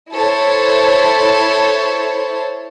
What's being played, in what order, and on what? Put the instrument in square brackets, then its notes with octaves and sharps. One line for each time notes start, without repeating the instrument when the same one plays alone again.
[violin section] E4 A4 C5 C#5